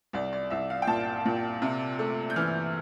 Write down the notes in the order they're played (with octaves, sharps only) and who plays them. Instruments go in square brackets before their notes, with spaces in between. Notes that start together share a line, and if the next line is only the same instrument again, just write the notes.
[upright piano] C2 D5
D5
C2 E5
F5
G5
A#2 A5
A#2
C3
A3
G6
E3 F6